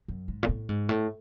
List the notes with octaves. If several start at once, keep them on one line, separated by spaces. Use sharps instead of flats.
F#2
G#2
A#2
A2
G#2
A2